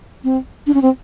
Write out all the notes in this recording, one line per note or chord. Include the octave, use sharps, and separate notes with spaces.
C4
D4
C#4
C4